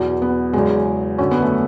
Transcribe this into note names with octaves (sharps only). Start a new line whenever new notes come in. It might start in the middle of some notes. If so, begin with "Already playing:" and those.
Already playing: E2 B2 F#3
B3
E2 C#3 F#3 G#3
F#2 D3 F#3 C#4
B3
A3